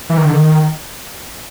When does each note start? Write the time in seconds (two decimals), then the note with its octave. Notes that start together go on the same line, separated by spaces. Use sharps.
0.10 E3
0.18 D#3
0.25 D3
0.33 D#3